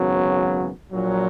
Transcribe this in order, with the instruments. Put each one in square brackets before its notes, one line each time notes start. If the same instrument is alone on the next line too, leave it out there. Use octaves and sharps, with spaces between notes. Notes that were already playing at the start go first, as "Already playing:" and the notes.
Already playing: [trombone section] G#1 F#2 C#3 F#3 B3
A#1 A#2 F#3